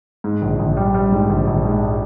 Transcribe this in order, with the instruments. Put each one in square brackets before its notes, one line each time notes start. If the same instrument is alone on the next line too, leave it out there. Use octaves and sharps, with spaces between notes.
[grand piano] G#2
A#1
A#1
G3
G3
G#2
A#1
A#1
G#2